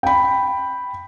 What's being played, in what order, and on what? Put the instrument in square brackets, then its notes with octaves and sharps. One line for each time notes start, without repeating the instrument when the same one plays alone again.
[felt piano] G5 B5